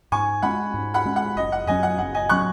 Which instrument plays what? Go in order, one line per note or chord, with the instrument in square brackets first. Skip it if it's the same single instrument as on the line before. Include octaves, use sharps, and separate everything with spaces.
[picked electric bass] G#2 [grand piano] G#5 C#6
[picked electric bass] G#3 C#4 [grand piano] F#5 B5
[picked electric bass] G#2
[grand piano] F#5 B5
[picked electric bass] G#3 C#4
[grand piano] F#5
[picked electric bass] F#1 [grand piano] D#5
[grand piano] F#5
[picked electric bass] F#2 F#3 C#4 [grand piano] D#5 G#5
[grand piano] F#5
[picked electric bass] F#1 [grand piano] F#5
[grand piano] D#5 G#5
[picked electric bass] F#3 C#4 [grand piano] C#6 F#6